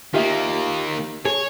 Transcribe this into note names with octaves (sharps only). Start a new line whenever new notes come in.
D#3 A#3 F4 G4 E5
G#4 C#5